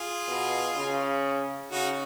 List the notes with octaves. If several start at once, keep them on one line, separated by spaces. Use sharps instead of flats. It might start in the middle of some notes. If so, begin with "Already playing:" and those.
Already playing: F4 G#4
B2
C#3
C#3 D#4 F#4